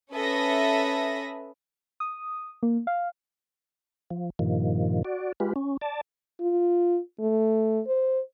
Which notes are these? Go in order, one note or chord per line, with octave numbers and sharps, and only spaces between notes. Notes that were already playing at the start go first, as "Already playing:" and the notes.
C#4 A4 B4 E5 D#6 A#6
D#6
A#3
F5
F3
G2 A#2 D#3 F3
F#4 D5
G#3 F4 G4 B4
C#4
D5 A5
F4
A3
C5